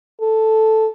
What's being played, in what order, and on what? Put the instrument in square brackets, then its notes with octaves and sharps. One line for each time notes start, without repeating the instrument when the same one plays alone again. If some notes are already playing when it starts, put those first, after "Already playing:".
[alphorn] A4